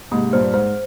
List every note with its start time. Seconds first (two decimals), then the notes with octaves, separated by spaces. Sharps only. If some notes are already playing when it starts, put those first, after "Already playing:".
0.12 G#2 C3 A#3
0.33 G2 A#2 C5
0.54 G#2 C5